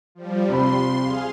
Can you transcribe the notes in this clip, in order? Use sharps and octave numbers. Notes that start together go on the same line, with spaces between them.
F3 G3
C3 C5 B5 C6
G#4 F5